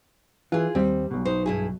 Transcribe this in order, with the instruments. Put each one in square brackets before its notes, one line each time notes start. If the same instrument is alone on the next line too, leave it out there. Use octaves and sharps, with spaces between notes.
[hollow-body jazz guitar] E3 [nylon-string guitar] F4 G#4
[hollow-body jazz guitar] D#2 C4 [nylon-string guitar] G3
[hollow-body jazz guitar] B1 B2
[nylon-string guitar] D#4 C5
G2 E4 G#4